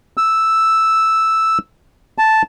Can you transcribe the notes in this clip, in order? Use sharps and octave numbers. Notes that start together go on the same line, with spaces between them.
E6
A5